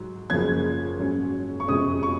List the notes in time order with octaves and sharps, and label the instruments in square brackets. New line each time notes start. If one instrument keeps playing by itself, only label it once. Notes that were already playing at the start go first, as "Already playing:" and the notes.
Already playing: [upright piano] G#2 F#3
F#1 F#2 F3 A#3 C#4 G#6
G#2 F#3 C#4
C#6
F2 C3 F3 G#3 C#4 D#6
C#6